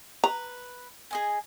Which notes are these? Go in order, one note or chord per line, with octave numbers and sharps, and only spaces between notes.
B4 A#5
G#4 D#5 G#5